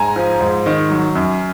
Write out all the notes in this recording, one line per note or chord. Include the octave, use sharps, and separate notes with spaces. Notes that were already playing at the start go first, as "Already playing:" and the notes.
Already playing: G#2 G#5 A#5
F3
G#2
D#3
F#3
F#2